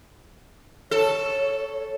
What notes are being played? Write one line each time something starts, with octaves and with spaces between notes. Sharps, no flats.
A4 C#5